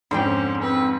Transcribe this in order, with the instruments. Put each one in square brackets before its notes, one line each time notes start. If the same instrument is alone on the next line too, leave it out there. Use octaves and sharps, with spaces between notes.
[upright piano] F2 G#2 [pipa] D3 D5 G5 [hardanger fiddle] C4 C#4
[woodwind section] C4 [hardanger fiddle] B4